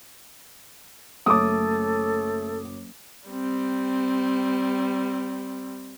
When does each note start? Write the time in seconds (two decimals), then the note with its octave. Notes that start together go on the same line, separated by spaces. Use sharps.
1.26 F#1 A3 A4 C#5 D6 D#6
3.28 G3 C4